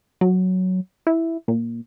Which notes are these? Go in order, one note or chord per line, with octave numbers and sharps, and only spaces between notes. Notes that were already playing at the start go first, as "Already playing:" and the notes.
F#3
E4
A#2